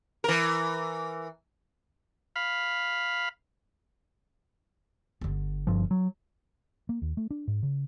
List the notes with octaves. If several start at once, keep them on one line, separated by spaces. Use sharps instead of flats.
E3 A#4
F5 B5
G1 D3
G2 F3
F#3
A#3
D#2
A3
D4
G#2
C#3